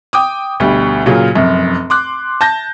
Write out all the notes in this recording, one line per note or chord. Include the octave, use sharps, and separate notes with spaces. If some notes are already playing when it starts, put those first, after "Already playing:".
G5 D6 D#6
D2 B2 G3
A#2 C#3 F#3 F4
F1 F#2
C6 D6 F#6
A5 G6 A#6